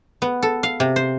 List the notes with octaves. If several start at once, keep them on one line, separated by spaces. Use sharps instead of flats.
B3
A4
F5
C3
C5